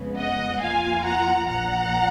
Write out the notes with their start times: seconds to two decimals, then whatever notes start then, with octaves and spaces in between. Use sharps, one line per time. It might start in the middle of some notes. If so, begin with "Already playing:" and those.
Already playing: F2 C#3 G#3 B3
0.18 D#5 F#5
0.61 F2 F3 A#3 F4 F5 G#5
1.05 F#5 A#5
1.48 A#1 A#2 F3 F#5 A#5